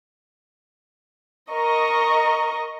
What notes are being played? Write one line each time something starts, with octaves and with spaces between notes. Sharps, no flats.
A#4 D#5 C#6